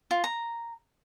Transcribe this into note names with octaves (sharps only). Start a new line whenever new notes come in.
F4
A#5